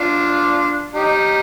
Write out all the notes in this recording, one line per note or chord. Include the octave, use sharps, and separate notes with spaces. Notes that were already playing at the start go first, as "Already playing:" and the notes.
Already playing: D4 F4
D#4 G4